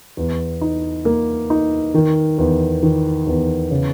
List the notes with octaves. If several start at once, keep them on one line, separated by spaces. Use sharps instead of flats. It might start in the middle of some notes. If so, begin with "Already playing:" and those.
E2
D#4
A#3
D#4
D#3
E2
D#3
E2
C#3